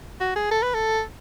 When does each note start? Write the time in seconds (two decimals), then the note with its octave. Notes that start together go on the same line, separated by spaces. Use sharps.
0.20 F#4
0.36 G#4
0.51 A4
0.63 B4
0.74 A4